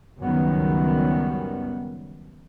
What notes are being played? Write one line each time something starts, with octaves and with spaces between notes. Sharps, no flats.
C#2 F#2 D#3 G3 B3